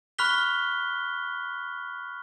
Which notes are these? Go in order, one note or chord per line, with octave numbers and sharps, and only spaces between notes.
B5 C#6 F6 F#6 B6 G7